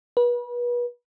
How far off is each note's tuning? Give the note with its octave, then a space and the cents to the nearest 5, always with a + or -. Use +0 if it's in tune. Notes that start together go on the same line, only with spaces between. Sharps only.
B4 -35